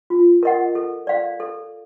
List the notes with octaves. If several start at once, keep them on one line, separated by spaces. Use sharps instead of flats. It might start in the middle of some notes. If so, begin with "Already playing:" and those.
F4
A#4 D#5 F#5
A4
D5 F5
A4